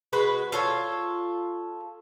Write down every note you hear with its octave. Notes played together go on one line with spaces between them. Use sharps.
G#3 F#4 B4
F4 A4 C#5